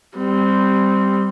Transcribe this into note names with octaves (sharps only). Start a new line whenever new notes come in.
G3 C4